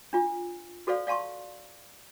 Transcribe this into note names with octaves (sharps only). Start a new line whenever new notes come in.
D4 F4
F#4 A4 C5 D5 F5
D5 F5 A5 C6 C#6